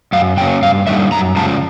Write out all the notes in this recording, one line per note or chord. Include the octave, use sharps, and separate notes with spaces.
F#2 F5
C#3 F#3 A#3 C#4 G5
G2 F5
D3 G3 A#3 D#4 E5
F#2 A#5
C#3 F3 G#3 A5